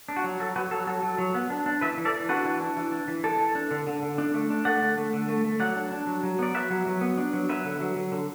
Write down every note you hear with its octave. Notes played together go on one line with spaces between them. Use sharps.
D4
F#4
F#3
F#3 A4
F#3 F#4 B4
F#3 A4
F#3 A4
F#3
F#3
B3
D4
D4
E3 B4 E5
E3
A4 D5
E3
D4 F#4 B4
E3
D4
E3
D4
E3
E3 A4 D5
E3
D4
D3
D3
D3
D4
A3
D4
A3 D5 F#5
D3
A3
D3
A3
A3
F#3 D5 F#5
D4
D4
F#3
F#3
B3 D5
F#3 B4 E5
F#3
F#3
B3
D4
F#3
F#3 B4 E5
D3
F#3
F#3
D3